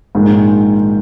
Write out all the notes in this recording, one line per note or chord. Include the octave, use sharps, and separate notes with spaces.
A#1 G#2 D#3 G#3